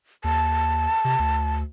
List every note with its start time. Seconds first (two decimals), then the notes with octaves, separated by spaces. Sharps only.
0.24 D#2 A5
1.05 C3
1.19 D2